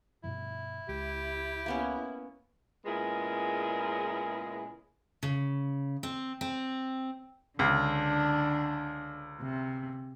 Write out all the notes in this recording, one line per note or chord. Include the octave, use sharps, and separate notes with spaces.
G2 B2 F3 E4
C#2 G#3 G4
A#3 B3 C#4
A#2 C#3 G#3 B3 E4 G#4
C#3
C4
C4
C#2 D3 D4
C3